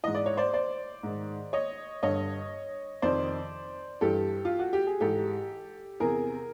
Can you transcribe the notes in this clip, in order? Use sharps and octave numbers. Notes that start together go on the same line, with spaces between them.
G#2 E3 D#5
D5
C#5
C5 D5
C5 D5
G#2 D#3
C#5 D#5
G2 D3 C#5 D#5
F2 C3 D#3 C5 D5
G2 E3 G4 A4
F4
F#4
G4
G#4
G#2 E3 G4 A4
E2 C3 E3 G#4 A#4